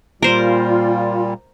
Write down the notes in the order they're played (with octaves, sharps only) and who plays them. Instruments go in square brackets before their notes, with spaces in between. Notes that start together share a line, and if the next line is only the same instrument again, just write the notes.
[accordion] A#2 G3 [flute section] F4 [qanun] A#4 C5